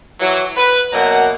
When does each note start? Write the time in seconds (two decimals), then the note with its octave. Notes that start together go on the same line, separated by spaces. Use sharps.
0.20 E3 F#3
0.57 B4
0.93 F#2 B2 F#3 A#3 F#5 A#5